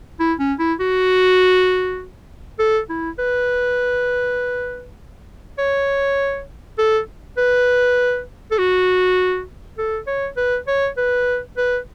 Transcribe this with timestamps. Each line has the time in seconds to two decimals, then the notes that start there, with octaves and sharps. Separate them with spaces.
0.20 E4
0.39 C#4
0.59 E4
0.80 F#4
2.59 A4
2.89 E4
3.19 B4
5.58 C#5
6.78 A4
7.37 B4
8.51 A4
8.58 F#4
9.78 A4
10.07 C#5
10.37 B4
10.67 C#5
10.97 B4
11.57 B4